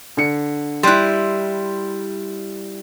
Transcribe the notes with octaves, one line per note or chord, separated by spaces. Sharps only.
D3 C#7
G3 E4 C6 F#6